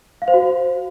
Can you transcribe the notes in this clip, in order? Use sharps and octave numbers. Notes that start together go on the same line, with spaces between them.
F5
C5
F#4